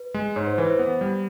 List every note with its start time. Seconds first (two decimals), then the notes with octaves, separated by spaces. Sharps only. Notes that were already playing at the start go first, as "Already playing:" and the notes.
Already playing: B4
0.14 G#3
0.36 G#2 C#5
0.47 C5
0.58 E3 B4
0.71 C5
0.79 B3
1.01 G3